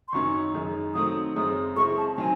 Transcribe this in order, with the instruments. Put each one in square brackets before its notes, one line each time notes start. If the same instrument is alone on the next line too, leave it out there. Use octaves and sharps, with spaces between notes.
[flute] C6
[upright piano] F#2 D#3 F#3 C#4 [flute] C#6
[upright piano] F#2 D#3 G#3
[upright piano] D#3 F#3 A3 C4 [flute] D#6
[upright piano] F#2 C#3 G#3 C4 [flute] D#6
[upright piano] C#3 G#3 C4 E4 [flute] C#6
[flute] A5
[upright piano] D#3 F#3 C4 [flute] G#5